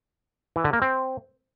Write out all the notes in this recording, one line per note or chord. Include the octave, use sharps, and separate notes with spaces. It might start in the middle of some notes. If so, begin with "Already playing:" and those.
E3
D3
A#3
C4